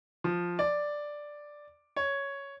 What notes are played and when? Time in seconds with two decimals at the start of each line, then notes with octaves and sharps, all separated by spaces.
0.24 F3
0.59 D5
1.96 C#5